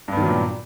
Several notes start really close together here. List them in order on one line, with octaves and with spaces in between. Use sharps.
G2 B3 D#3 F#3 A#2